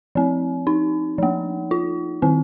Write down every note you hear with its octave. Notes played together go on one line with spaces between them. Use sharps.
F3 C4
D#4
F3 A#3
F4
D#3 C4